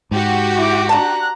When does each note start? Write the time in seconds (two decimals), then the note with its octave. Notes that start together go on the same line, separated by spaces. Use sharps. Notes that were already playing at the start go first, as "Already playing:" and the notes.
0.11 G#2 F#4 G4
0.58 E4 D6
0.89 D4 A5 A#5 F#6